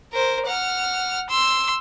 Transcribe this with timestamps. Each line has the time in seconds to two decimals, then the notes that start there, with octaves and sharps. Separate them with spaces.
0.13 A#4 C5
0.46 F#5 F6
1.30 C6 E6